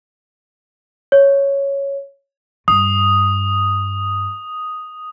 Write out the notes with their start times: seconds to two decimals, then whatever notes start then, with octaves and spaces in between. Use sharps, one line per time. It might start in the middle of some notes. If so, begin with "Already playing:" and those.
1.12 C#5
2.68 G2 D#6